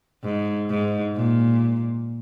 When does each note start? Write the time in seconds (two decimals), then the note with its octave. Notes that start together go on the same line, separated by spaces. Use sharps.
0.24 G#2
0.70 G#2
1.16 A#2